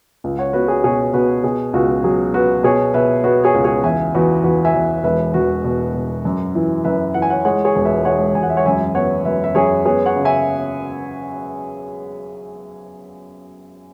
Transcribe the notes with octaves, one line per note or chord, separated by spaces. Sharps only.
C#2
C#5 F#5
B3 F#4 B4
G#4 C#5
B2 G#4 C#5
B2 F#4 B4
B2 G#4
C#2 F#4
F#3 G#4
B3 F#4 B4
B2 G#4 C#5
B2 B4 E5
B3 F#4 B4
G#4 C#5
C#2
G#4 C#5
E2 E5 G#5
E2 F#4 B4
E2 F#4 B4
E5 G#5
E2
E1 B4 E5
E1 F#4 B4
B2
B2
F#2
E3
F#2 B4 E5
E3 F#5
G#5
C#5 F#5
G#3 C#5 F#5
G#4 C#5
E1
B4 E5
G#3 C#5 F#5
E1 G#5
F#5
E5
C#5 F#5
F#2 E5 G#5
B3 C#5 F#5
F#2 B4 E5
E5
F#2 G#4 C#5
B3 G#4 C#5
C#5 F#5
C#3
E5 G#5